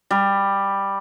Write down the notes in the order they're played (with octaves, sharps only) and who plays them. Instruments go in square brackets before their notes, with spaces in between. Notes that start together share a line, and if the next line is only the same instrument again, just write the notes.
[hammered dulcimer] G3